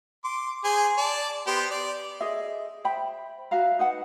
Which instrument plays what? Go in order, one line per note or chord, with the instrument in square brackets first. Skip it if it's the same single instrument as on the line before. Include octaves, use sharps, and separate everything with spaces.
[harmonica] C6 D6
G#4 C5 G#5
D5 A5
B3 G4 C5
D5
[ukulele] G#4 A4 D#5 E5
C5 E5 G5 B5
F#4 E5 F5 A#5
D#4 B4 F#5 A5